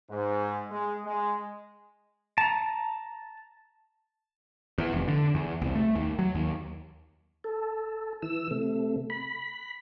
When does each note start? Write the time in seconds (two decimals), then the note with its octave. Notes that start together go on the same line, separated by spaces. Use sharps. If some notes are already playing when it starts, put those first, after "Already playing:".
0.10 G#2
0.69 G#3
1.04 G#3
2.38 A5 A#5
4.78 E2
4.92 F1
5.08 D3
5.35 E2
5.62 C2
5.75 A3
5.95 D#2
6.19 F#3
6.35 D#2
7.44 A4
8.22 E3 E6
8.51 C3 A3
9.10 B5